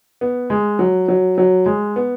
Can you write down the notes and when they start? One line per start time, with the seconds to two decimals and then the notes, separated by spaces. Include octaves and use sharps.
0.21 B3
0.50 G#3
0.79 F#3
1.08 F#3
1.38 F#3
1.66 G#3
1.96 B3